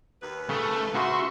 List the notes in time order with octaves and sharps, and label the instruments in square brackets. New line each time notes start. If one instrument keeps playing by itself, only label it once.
[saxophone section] D#2 B4
[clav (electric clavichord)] C#3 [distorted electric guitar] A3
[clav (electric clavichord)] C#3 [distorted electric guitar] F#4 [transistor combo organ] E5 C6 C#6